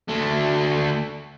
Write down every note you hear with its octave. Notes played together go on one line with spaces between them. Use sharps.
D2 A3